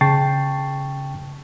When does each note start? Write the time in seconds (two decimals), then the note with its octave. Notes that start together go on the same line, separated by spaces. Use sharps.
0.01 C#3 G5 A5 C#6 A6 C7